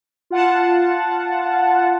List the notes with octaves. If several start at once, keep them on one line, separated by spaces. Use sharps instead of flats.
F4 F#5 A5